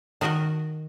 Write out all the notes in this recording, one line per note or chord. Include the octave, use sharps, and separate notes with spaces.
D#3 D#4 F#4 A#4 D#5